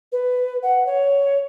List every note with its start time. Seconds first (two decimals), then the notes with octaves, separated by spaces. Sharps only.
0.12 B4
0.63 F#5
0.86 C#5